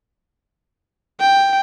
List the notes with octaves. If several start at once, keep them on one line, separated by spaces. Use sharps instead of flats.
G5